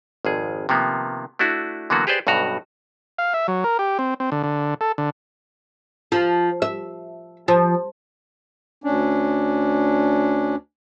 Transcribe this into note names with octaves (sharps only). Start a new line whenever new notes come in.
G#1 F2 G#4
C3 D#3 F3 A#3 B3
A3 D4 E4 F#4
D3 E3 F#3 A#3 B3 F#4
G4 G#4 B4 C5 D5
B1 G2 B2 F#4 A#5
F5
E5
F#3
A#4
G4
C4
C4
D3
D3
A4
D3
F3
E5
F3
D2 C#4 D4